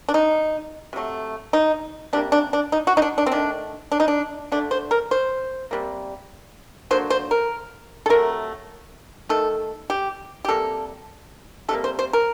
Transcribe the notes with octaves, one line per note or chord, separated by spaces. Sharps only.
D4
D#4
C3 F#3 A3
D#4
C3 G3 A#3 D4
D4
D4
D#4
F#4
D#4
D4
D4
C4
D#3 A3 D4
D4
D#4
D4
D3 A3 D4
C5
A#4
C5
C3 G3 A#3
D3 F#3 A#3 C5
C5
A#4
A4
C3 F#3 A3 A#4
D#3 A3 A4
G4
G4
C3 G3 A#3 A4
C3 G3 A#3 A4
C5
C5
A#4